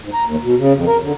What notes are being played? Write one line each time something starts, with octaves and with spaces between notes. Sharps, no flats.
G#2
A#5
D#2
B2
C#3
F2
A#4
D3